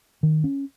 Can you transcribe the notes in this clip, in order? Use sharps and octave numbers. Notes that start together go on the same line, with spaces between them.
D#3
C#4